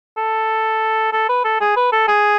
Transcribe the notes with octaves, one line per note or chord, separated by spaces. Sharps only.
A4
A4
B4
A4
G#4
B4
A4
G#4